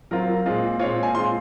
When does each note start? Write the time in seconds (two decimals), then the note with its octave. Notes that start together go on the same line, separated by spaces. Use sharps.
0.11 F#3 C4 F4 A#4
0.46 A#2 G#3 C4 F4
0.79 A#2 G#3 C4 F4 C#5
1.03 G#5
1.15 A#2 G#3 C4 F4 C6